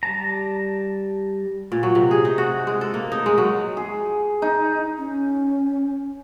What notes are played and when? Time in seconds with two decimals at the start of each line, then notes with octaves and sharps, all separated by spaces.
0.03 G3 A5 A#5
1.72 A#2
1.83 F#3
1.95 C3
2.11 G#4
2.25 D#4
2.38 F#4
2.67 G#3
2.81 A4
2.94 A#3
3.12 D#4
3.26 G#3
3.38 F#3
3.77 G#4
4.42 D#4
4.98 C#4